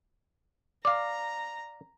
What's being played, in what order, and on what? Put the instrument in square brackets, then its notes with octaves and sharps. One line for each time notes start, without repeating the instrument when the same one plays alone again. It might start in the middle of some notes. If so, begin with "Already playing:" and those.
[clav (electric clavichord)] D5 F5 [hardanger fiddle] A#5 [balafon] D6